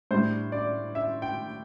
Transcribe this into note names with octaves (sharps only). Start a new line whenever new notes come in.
A2 G3 D4 C5
D5
E5
G5